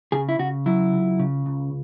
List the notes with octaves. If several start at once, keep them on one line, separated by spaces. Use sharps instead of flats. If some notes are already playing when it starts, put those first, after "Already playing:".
C#3 G#4
E4
C#3 F#4
F#3 E4
C#2
C#3
C#2